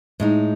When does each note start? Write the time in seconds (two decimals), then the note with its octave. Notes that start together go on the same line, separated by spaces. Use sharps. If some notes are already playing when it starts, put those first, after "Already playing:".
0.20 A2 G#3 D#4